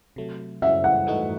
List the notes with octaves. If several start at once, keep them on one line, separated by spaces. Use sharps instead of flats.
C3 F#3 A3
F#2 C#3 G#3 C#4 F#4 E5
F#5
G#2 E3 A3 D#4 F#4